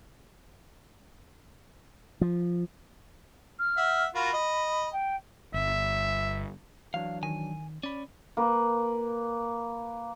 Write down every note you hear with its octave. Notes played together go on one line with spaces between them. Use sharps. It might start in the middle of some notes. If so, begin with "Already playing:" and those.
F3
F6
E5 F#5
F4 F#4 A#4 B5
D#5
G5
G1 E5
E3 F#3 D4 F5
D#3 G#5
C#4 D5 B5
A#3 B4